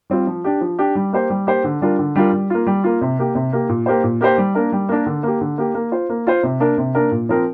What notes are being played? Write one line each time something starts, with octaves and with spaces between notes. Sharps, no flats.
G3 C4 F4
F3
D4 G4
F3
D4 G4
G3
A#3 G4 C5
G3
A#3 G4 C5
D3
G3 D4 F4 A#4
D3
G3 D4 F4 A#4
G3
A#3 F4
G3
A#3 F4
C3
A#3 G4
C3
A#3 G4
A#2
A#3 G4 C5
A#2
A#3 G4 C5
G3
A#3 D4 A#4
G3
A#3 D4 A#4
D3
A#3 G4
D3
A#3 G4
A#3
F4 C5
A#3
F4 C5
C3
A#3 D4 A#4
C3
A#3 D4 A#4
A#2
F3 C4 A#4